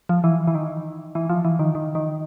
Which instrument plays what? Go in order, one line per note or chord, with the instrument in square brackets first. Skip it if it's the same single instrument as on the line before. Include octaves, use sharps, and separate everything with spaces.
[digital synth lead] F3
E3
E3
D#3
E3
F3
E3
D#3
D#3
D#3